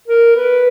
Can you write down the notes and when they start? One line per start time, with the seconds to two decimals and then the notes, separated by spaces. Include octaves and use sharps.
0.08 A#4
0.36 B4